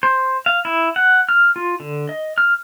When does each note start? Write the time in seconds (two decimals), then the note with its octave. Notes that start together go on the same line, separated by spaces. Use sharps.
0.03 C5
0.46 F5
0.65 E4
0.96 F#5
1.29 F6
1.56 F4
1.80 D3
2.09 D#5
2.38 F6